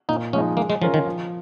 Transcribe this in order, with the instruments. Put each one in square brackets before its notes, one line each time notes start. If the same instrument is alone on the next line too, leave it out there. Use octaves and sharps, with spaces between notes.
[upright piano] A#2 [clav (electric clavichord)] D#4
[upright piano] F3 G#3 D#4 [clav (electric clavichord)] C#4
[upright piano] G#3 [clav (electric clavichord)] A#3
[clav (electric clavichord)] G#3
[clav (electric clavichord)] F3 [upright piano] C#4 F4 A#4
[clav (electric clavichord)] D#3
[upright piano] F3